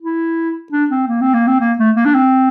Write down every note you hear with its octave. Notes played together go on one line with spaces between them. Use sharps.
E4
D4
C4
A#3
C4
A#3
C4
A#3
A3
A#3
D4
C4